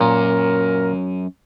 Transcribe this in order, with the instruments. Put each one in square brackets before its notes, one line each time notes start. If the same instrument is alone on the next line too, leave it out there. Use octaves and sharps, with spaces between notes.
[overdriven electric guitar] F#2 C#4 [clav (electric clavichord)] A#2 [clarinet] A#4